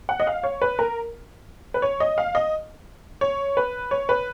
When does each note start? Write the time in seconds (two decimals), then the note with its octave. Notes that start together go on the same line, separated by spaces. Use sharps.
0.09 F#5
0.20 D#5
0.27 F5
0.44 C#5
0.62 B4
0.79 A#4
1.74 B4
1.82 C#5
2.00 D#5
2.18 F5
2.35 D#5
3.21 C#5
3.57 B4
3.91 C#5
4.09 B4